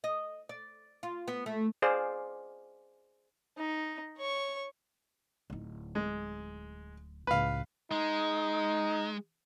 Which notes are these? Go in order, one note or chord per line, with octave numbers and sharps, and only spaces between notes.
D#5
D5
F4
B3
A3
G#4 C5 D5 F5
D#4
C#5 C#6
D1 D#4
G#3
C#2 A2 B4 F5
G#3 D#4